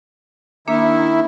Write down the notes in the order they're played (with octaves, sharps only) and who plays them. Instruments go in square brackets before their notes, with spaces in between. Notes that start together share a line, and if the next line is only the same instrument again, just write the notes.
[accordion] D#3 E4 [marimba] A#3 D4